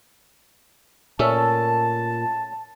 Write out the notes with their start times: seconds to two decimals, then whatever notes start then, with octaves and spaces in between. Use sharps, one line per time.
1.19 A#2 A3 C#4 E5 A5